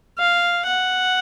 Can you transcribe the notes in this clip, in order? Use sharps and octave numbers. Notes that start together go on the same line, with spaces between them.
F5
F#5